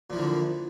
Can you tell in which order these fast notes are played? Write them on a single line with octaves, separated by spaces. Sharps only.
A#2 F3 E3 D3